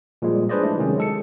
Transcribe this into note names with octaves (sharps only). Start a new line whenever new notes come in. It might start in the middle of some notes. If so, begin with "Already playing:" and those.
A#2 F3 G3 G#3
D4 G#4 B4 C5 D5 D#5
F#3 G#3 A3 D4 E4
C3 D#3 F#3 G#3 C#4 G#4
G#3 A4 C#7